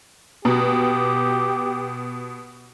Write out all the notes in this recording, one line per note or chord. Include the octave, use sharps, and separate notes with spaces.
B2 G4